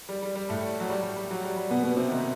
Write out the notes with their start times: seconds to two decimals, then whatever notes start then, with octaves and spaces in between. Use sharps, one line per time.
0.09 G3
0.23 G3
0.35 G3
0.49 A2 A3
0.80 F#3
0.90 G3
1.03 G3
1.16 G3
1.31 F#3
1.44 G3
1.57 G3
1.70 B2 B3
1.83 B2 B3
1.97 C3 C4
2.10 D#3 D#4